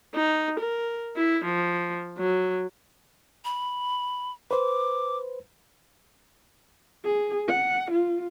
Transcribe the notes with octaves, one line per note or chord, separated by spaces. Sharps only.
D#4
A#4
E4
F3
F#3
B5
B4 C5 D6
G#4
F#5
F4